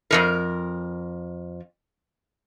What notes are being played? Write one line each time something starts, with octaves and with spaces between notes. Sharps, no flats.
F2 D#3 A#4